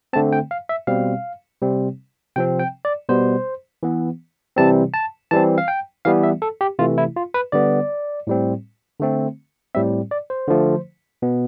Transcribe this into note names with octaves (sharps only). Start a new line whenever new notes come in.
D3 A3 C4 A5
G5
F5
E5
B2 G3 C4 F5
C3 G3 C4
C3 F3 C4 G5
G5
D5
B2 G3 B3 C5
E3 B3
C3 E3 G3 C4 A5
A5
E3 G3 C4 A5
F5
G5
E3 G3 B3 F5
E5
A4
G4
C3 E3 A3 F4
E4
F4
B4
D3 G3 B3 D5
A2 G3 C4
D3 A3 C4
A2 G3 C4 E5
D5
C5
D3 F3 A3
B2 B3